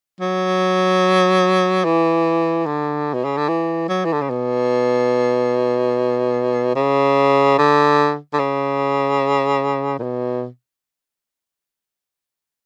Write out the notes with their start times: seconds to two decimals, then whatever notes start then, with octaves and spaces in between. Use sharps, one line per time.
0.21 F#3
1.85 E3
2.66 D3
3.14 B2
3.25 C#3
3.37 D3
3.49 E3
3.89 F#3
4.05 E3
4.13 D3
4.22 C#3
4.30 B2
6.75 C#3
7.58 D3
8.33 D3
8.39 C#3
9.99 A#2
10.03 B2